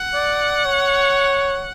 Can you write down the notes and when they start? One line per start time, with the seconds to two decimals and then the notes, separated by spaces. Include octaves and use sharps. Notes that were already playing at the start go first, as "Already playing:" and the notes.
Already playing: F#5
0.14 D5
0.65 C#5